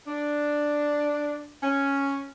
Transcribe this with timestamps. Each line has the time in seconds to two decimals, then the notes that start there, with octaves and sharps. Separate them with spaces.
0.08 D4
1.63 C#4